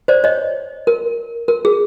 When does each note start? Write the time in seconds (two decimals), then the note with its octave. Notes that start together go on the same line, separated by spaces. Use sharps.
0.08 C5 D5
0.24 C#5 D#5
0.87 A#4
1.48 A#4
1.65 G#4